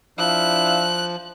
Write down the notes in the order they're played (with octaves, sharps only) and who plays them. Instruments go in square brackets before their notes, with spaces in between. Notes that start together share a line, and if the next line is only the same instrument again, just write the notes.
[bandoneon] F3 [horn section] D4 E4 F5 [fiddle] F#6